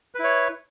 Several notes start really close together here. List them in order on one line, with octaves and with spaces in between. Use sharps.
B4 E4 C#5